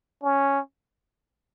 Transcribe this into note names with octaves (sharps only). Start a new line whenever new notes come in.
C#4